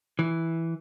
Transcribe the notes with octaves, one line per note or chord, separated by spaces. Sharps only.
E3